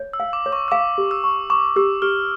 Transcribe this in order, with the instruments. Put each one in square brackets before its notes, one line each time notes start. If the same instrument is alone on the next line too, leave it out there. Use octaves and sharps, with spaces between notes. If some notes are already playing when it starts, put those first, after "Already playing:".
Already playing: [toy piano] C#5
[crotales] E6
[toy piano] F5
[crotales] D6
[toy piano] C#5
[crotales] C#6
E6
[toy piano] F5 [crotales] D6
[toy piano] G4
[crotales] E6
[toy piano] C#6
[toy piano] C#6 [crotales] D6
[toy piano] G4 [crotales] E6
[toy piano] G4 [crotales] F6